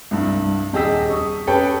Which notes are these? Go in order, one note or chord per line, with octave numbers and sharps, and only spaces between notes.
C2 G2
D#1 G4 G#4 D#5 E6 B6
C#6 D#6
C#4 G4 A4 B4 C#5 G5